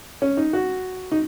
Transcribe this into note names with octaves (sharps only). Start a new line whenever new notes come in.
C#4
D#4
F#4
D#4